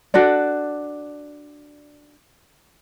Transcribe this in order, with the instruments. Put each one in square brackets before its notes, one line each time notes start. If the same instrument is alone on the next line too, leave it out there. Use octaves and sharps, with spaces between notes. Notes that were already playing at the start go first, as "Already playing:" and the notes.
[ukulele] D4 F#4 A4 D5